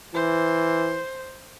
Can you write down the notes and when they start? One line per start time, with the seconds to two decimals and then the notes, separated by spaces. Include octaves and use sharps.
0.14 E3 C5